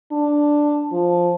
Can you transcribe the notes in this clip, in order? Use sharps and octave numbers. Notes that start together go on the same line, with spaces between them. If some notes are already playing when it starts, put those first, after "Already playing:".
D4
F3